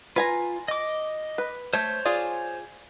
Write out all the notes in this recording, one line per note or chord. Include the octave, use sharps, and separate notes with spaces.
F4 B4 G#5 A#5
D#5 D6
B4
A3 C5 C#5 G6
F4 G#4 D5